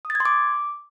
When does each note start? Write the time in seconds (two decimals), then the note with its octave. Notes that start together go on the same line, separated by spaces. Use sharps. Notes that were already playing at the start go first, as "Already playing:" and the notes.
0.05 D#6
0.10 A6
0.15 G#6
0.20 C6
0.25 D6